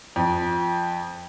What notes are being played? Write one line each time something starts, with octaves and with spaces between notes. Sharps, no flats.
F2